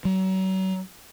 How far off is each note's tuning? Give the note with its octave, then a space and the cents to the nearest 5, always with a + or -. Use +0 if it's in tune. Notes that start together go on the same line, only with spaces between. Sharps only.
F#3 +35